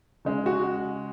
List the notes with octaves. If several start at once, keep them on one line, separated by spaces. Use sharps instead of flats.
C#3 G#3
F#4